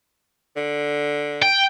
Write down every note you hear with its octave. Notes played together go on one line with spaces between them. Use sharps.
D3
G5